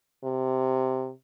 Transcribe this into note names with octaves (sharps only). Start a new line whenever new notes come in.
C3